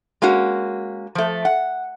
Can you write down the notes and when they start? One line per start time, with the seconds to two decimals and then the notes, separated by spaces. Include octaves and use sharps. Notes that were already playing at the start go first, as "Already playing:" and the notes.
0.22 G#3 A#3 C#4 F#4
1.15 F3 A3
1.45 F#5